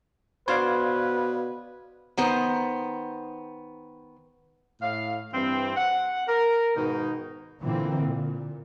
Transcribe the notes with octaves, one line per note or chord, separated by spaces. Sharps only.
B2 D4 F#4 B4 C5 D5 F5 G#6
D#3 B3 C5
A2 F5
G2 E3 C4
F#5
A#4
G#2 B2 D#3 D#4
A#2 D3 E3 A#3 C4
A#2